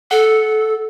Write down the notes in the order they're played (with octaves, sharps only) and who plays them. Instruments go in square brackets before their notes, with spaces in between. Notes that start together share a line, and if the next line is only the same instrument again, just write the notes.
[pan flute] A4 [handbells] F#5